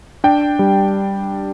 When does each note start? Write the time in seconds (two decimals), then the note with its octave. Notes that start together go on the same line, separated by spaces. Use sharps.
0.24 D4 G5
0.59 G3